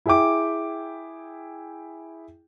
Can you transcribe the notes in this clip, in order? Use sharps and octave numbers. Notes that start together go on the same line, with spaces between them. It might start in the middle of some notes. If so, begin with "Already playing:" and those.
E4 G#4 E5 G5 D6